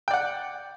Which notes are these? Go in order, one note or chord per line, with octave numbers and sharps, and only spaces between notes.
D5 F#5 G5